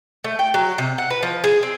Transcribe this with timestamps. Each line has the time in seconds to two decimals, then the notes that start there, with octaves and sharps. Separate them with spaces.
0.24 A3
0.39 G5
0.54 F#3
0.78 C3
0.98 F#5
1.10 B4
1.23 F3
1.44 G#4
1.63 C4